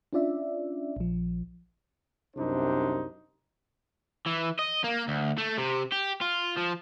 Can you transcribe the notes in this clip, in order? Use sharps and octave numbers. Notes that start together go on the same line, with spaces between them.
C#4 D4 F4 D5 E5
A#1 F3
C2 F#2 C3 D4 D#4 C5
E3
D#5
A#3
D2
A3
C3
G4
F4
F3